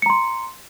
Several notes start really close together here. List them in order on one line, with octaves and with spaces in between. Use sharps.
C#7 A#5 C6